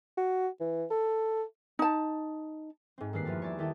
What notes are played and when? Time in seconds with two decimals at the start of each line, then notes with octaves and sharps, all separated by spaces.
0.18 F#4
0.61 E3
0.91 A4
1.79 D#4 A5
2.98 G#2 C4
3.13 G2 D#3 A#3 B4 C7
3.25 E2 F3 F4 D5
3.42 C#5 D5 E5
3.58 D#3 D#4 E4 G4 A4